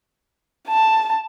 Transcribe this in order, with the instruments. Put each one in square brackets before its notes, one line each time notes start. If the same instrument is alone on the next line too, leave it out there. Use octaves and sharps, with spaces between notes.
[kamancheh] A5